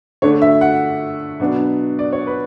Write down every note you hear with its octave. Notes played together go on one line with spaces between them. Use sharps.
D3 A3 D4 C#5
E5
F#5
B2 F#3 B3 D4
D5
C#5
B4